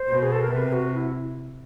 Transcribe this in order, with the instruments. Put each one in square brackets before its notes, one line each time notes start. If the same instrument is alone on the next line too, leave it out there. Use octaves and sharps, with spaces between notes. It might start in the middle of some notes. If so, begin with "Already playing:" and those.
Already playing: [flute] C5
[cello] B2
[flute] G#4
A4
A#4
[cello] C3 [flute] B4
[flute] F#4
E4